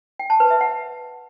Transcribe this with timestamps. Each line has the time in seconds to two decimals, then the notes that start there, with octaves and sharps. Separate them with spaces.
0.19 G5
0.30 A5
0.40 B4
0.50 E5
0.61 F#5